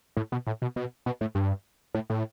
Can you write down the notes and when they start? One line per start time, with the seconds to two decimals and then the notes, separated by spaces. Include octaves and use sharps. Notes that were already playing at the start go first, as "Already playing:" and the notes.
0.17 A2
0.32 B2
0.47 A2
0.62 B2
0.76 B2
1.06 B2
1.21 A2
1.35 G2
1.94 A2
2.10 A2